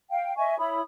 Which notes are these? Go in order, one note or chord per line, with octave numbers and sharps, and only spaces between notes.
F5 G5
D#5 E5 G#5 C#6
E4 C#5 B5 D#6